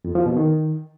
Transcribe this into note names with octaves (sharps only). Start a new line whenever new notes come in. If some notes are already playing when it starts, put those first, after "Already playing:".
F2
F3
B2
D#3